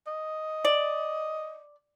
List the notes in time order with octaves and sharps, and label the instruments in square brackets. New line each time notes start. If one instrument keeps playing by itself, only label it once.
[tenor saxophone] D#5
[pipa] D5